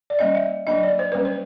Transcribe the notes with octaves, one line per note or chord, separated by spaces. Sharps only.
D5
G3 A#3 C#4 D#5
E5
F#3 A#3 D4 D#5
D5
C5
G3 A#3 C#4 B4
C5